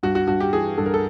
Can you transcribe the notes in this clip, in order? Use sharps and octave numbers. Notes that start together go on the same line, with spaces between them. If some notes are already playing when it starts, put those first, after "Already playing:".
G2 F#4
F#4
G2 F#4
G4
E3 G#4
G2 A4
A#4
A4